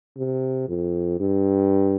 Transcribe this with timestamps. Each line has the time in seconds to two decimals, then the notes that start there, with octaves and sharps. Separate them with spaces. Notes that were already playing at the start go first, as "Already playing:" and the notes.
0.17 C3
0.69 F2
1.20 G2